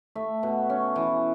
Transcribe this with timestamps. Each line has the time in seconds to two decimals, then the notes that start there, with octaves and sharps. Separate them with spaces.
0.15 A3 E5
0.43 B2
0.70 C#4
0.96 E3